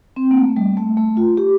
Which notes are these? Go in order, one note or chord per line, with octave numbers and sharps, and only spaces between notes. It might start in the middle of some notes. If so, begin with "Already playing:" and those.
C4
A#3
A3
G3
A3
A3
F4
G4